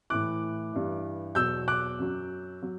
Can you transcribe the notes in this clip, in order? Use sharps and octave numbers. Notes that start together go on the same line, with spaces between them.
A2 E3 D6 F#6
G2 E3
E2 B2 F#3 E6 G6
D6 F#6
F#2 F#3
F#3